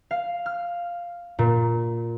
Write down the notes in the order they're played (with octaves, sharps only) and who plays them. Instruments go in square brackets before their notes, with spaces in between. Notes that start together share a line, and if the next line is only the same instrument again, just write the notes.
[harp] F5
F6
A#2